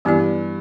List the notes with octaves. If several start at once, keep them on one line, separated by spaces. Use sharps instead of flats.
G2 E3 B3 E4 G4 D5